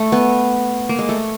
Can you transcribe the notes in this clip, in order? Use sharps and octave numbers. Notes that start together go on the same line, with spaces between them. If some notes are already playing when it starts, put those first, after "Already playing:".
Already playing: A3
B3
A#3
G#3
A3